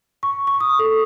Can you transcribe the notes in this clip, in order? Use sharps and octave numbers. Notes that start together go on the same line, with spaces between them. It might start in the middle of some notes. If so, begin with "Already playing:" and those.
C#6
C#6
D#6
A4